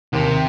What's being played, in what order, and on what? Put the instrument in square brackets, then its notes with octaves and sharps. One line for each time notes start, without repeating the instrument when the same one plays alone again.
[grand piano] D#2 [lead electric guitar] C3